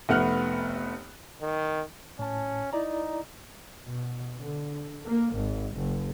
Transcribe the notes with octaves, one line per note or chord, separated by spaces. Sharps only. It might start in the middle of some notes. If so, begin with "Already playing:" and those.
F1 A3 B3 F#5 F6 F#6
D#3
A2 C#4 A5
D#4 E4 D5 A#5
B2
D3
A#3
G#1
F#1